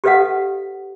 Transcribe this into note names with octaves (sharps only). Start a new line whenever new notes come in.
G4 A4 B4 D#5 F5 F#5